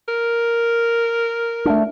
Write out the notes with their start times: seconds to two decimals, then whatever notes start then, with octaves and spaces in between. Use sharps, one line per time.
0.08 A#4
1.65 A3 B3 D4